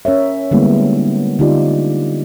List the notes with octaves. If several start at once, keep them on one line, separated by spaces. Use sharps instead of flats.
C#4 A#4 C#5 E5
D3 G3 G#3 A#3 B3 E4
D3 D#4 F4 G4 D5